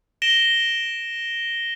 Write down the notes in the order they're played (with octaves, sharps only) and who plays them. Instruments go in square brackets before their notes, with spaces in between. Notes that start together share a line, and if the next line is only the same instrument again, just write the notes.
[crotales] A#6 D7 E7 G7